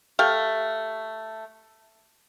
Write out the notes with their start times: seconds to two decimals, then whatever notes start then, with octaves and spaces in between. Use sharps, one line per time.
0.19 A3 G4 F5